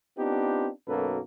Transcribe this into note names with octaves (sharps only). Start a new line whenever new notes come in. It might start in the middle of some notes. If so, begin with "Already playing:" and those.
B3 C4 D4 D#4 F4 G4
B1 F#2 A#3 F#4 A4 B4